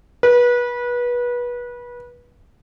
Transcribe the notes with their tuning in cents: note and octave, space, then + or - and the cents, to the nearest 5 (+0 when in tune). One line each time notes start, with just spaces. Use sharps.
B4 -25